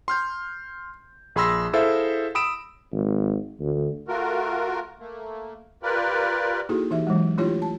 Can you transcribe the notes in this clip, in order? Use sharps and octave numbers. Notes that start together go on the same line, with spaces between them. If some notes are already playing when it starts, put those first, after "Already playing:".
C6 F6 G6
A#1 G#4 B5 C6 E6 A#6
E4 G#4 A4 C5 E5 F5
B5 D#6 E6 D7 E7
G#1
D2
A3 F4 F#4 A#4
A3 A#3
F4 G4 A#4 B4 D5
A#3 D#4 E4 F#4 G#4 A4
E3 D#4 G4 E5
E3 F#3 G#3
A3 D4 E4 F4 G4 C#5
A5